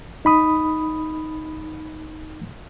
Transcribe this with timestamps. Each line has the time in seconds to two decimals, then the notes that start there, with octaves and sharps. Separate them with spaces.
0.25 D#4 B5 D#6